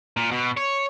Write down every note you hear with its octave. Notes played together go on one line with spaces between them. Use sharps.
A#2
B2
C#5